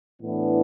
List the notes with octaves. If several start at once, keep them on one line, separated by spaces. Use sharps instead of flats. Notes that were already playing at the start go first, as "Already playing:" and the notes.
A2 E3 B3 D4